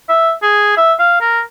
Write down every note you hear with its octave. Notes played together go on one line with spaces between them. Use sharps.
E5
G#4
E5
F5
A#4